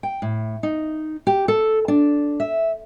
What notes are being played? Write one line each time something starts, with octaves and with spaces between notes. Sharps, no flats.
G5
A2
D#4
G4
A4
D4
E5